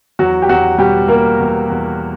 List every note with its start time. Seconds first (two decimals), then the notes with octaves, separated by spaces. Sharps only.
0.19 E2 F#3 F#4
0.42 G4
0.48 E2 F#3 F#4
0.78 B2 G3 G4
1.08 G3 A#3 A#4
1.39 E2
1.69 E2